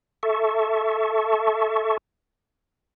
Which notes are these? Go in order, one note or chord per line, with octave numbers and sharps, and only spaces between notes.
A4 E5 A5 C#6